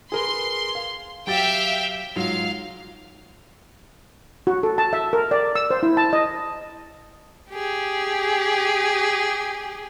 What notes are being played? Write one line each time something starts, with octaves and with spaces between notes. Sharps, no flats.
G#4 A#4 B4 C6
F5
F#3 G4 E5 F5 G5 A6
G#2 F#3 F4 F5
F#4
A4
A5
E5
A#4
D5
E6
C5
E4
A5
D#5
G4 G#4